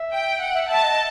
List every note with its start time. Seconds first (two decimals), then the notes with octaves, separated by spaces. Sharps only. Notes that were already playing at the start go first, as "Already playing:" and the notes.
Already playing: E5
0.14 G5
0.41 F#5
0.55 E5
0.69 E5 A5
0.83 D#5